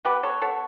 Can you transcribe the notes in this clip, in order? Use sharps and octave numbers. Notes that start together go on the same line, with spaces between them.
B3 G4 B4
A4 C#5
B3 A4 C#5